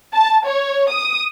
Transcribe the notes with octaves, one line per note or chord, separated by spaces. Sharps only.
A5
C#5
D#6